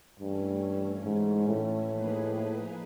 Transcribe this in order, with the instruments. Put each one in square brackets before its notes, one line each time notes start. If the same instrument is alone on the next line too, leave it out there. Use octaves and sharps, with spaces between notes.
[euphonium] G2 [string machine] E3 A3 C#4
[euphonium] G#2
A2
[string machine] F3 A#3 D#4 G#4 B4